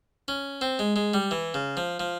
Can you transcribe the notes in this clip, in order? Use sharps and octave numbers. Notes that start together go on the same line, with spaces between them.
C#4
C4
G#3
G#3
G3
E3
C#3
F3
F3